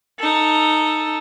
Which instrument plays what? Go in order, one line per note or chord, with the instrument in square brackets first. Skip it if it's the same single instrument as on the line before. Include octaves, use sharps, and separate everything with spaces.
[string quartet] D#4 A4